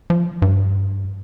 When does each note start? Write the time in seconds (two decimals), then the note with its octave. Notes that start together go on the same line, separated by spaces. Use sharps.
0.10 F3
0.42 G2